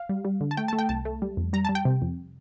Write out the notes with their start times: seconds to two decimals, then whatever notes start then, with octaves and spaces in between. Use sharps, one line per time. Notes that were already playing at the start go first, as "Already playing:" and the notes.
Already playing: F5
0.09 G3
0.25 G3
0.41 D3
0.51 A5
0.57 A3 G5
0.68 A3 A5
0.79 G5
0.89 C2 A5
1.05 A3
1.22 G3
1.37 F2
1.53 G3 A#5
1.65 G3 A5
1.75 G5
1.85 C3
2.02 F2